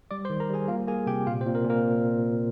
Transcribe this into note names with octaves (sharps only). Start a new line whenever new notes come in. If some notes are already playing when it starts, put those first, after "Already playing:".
G3 D5 D6
C5 C6
D#3
A#4 A#5
G3 G#4 G#5
A#3 F4 F5
A#3 G#4 G#5
C3 G4 G5
A#2 F4 F5
C4 C5
A#2
A#3 A#4
A#2 A#3 A#4